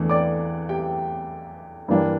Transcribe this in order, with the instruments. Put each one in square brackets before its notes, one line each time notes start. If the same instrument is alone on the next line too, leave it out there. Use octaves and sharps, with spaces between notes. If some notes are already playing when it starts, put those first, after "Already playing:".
Already playing: [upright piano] E2 E3 A3 D4
D5 D6
G4 G5
G2 E3 A#3 D4